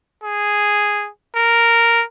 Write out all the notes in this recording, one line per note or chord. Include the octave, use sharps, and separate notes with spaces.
G#4
A#4